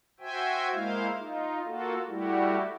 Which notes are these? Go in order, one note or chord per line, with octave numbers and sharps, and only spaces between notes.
F#4 C5 E5 G5 G#5
G#3 A#3 E4 C5 F5
D#4 F4
A#3 F4 F#4 A4
G3 A3 E4 F#4 G4